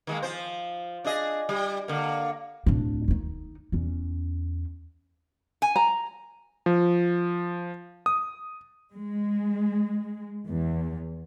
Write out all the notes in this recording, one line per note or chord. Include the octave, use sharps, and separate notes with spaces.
D#3 G#3 A#3
F3 C5
D4 G#4 D#5
G3
D3 A#3
D1 D4
D#3 D#4
E2 C#4
G#5
A#5
F3
D#6
G#3
E2